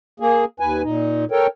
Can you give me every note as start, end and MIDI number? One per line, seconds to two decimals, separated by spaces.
0.20 0.45 58
0.20 0.45 68
0.60 0.82 39
0.60 0.82 71
0.60 0.82 80
0.83 1.25 46
0.83 1.25 63
1.31 1.47 69
1.31 1.47 70
1.31 1.47 73
1.31 1.47 79